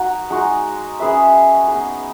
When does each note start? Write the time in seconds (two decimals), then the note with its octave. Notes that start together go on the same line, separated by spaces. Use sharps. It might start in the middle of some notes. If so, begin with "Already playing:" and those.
Already playing: D#4 F#4 A#4
0.30 G#3 D#4 F#4
1.00 C#4 G#4 B4 E5
1.68 B3 D#4 G#4